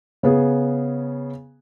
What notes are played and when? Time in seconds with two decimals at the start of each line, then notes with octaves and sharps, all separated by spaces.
0.23 C#3 B3 G#4